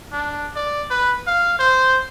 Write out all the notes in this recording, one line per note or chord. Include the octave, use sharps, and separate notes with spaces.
D4
D5
B4
F5
C5